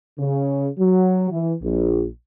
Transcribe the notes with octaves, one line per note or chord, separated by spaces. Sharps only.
C#3
F#3
E3
A#1